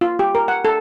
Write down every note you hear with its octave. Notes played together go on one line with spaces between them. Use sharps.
F4
G4
A#4
F#5
A4